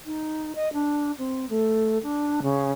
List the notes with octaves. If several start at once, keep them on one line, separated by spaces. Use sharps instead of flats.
D#4
D#5
D4
C4
A3
D4
C#3